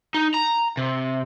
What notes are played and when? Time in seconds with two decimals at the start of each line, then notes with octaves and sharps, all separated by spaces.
0.14 D#4
0.34 A#5
0.77 C3